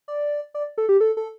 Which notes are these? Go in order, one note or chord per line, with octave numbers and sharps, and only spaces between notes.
D5
D5
A4
G4
A4
A4